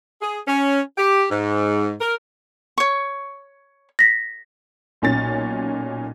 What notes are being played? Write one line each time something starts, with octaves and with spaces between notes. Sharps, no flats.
G#4
C#4
G4
G#2
A#4
C#5 C#6
A#6 B6
B1 A#2 C#4 A6